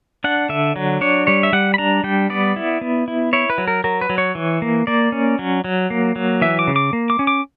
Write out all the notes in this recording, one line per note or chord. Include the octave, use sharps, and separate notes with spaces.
D4 F#5
D3 E5
F#3
D4 C#5
G3 C#5
E5
G3 F#5
B5
D4 A#5
G3 G5
B3 D5
E4
B3
E4
E4 C#5
B4
F#3
A#4
F#3 A#4
B4
F#3
C#5
E3
A#3
A#3 D5
C#4
F#3
F#3
A#3
F#3
E3 E5
D6
C#3
D6
A#3
D6
C#4
D6